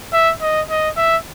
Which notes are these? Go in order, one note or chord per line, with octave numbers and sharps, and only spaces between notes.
E5
D#5
D#5
E5